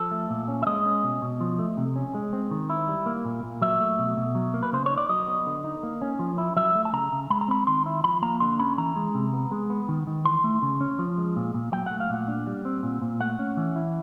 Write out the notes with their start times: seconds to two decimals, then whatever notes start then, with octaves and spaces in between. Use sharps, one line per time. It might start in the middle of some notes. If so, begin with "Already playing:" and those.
Already playing: F3 A4
0.11 A3
0.30 A#2
0.48 C#4
0.63 E5
0.67 G#3 D#5
0.85 C#4
1.03 B2
1.22 B2
1.40 F3
1.59 A3
1.77 C3
1.96 C#4
2.14 G#3
2.33 C4
2.51 D#3
2.70 E4
2.88 G3
3.06 A#3
3.25 A#2
3.43 A#2
3.61 F#3 E5
3.80 A3
3.99 B2
4.17 B2
4.35 F#3
4.54 A#3
4.63 B4
4.72 C#3 C5
4.86 D#4 C#5
4.97 D5
5.09 F#3 D#5
5.27 B3
5.46 D3
5.64 D#4
5.83 A#3
6.01 C#4
6.19 F3
6.38 E4
6.56 F#3 E5
6.75 A3
6.85 A5
6.93 C#3 A#5
7.12 C#3
7.30 G#3 B5
7.41 A#5
7.48 C4 B5
7.67 D#3 C6
7.86 E4
8.04 F3 B5
8.22 A#3 A#5
8.40 D3 C6
8.59 C#4 B5
8.78 E3 A#5
8.96 G#3
9.15 C3
9.33 B3
9.51 G#3
9.70 B3
9.88 D#3
10.07 D#3
10.25 E3 C6
10.44 A3
10.62 C#3
10.81 C#4
10.99 F3
11.18 G#3
11.36 A#2
11.54 A#2
11.73 F#3 G5
11.86 A3 F#5
12.00 F5
12.09 A#2 F#5
12.28 D4
12.47 G3
12.65 C4
12.83 A#2
13.02 A#2
13.20 A3 F#5
13.39 C#4
13.57 E3
13.76 E4